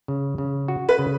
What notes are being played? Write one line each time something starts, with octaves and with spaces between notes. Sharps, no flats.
C#3
C#3
F#4
B4
C#3